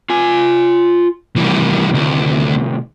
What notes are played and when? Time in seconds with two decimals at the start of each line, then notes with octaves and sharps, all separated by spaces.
0.10 F4 G#5
1.36 A2 C3 D#3 E3 G3
1.94 D2